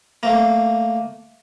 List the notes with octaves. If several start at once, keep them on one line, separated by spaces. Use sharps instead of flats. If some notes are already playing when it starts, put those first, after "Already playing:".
A3 A#3